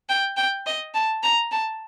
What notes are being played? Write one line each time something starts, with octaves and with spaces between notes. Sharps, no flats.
G5
G5
D#5
A5
A#5
A5